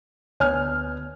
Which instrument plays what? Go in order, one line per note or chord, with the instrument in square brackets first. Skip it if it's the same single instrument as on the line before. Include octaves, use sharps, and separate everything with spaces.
[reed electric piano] D2 B3 [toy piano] C#5 [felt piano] G#5 F6